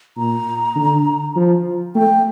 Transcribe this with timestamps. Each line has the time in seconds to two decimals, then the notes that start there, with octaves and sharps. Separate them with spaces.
0.17 A#2 A#5
0.76 D3
1.36 F3
1.95 A3 G5